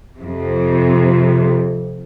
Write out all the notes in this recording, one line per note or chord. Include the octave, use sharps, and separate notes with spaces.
F2 C3